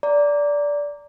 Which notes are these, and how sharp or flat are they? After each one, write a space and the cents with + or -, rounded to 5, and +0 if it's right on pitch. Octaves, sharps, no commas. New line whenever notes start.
D5 -15 A#5 -10